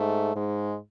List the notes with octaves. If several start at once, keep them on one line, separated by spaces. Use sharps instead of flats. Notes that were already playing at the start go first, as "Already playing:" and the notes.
Already playing: G#2 A3
G#2 G#3